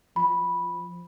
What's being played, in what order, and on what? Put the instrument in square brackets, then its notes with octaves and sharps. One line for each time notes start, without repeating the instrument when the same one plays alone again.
[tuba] F3 [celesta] B5